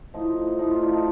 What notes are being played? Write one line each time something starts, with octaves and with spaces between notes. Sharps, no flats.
A2 F3 D#4
A2 F3 D#4
F4
D4
D#4